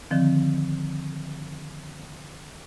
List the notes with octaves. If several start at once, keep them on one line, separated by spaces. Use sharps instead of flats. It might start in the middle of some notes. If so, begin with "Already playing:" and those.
D3 D#3 F3 C4